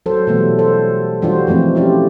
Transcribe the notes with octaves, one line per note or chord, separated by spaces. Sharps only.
F#3 A4 C5
B2 E3 F#3 G3 A3 B3
A4 C5
E3 G3 D4 F4 F#4 C5
E3 F3 G#3 A3 C4
C#4 E4 F4 G4 D5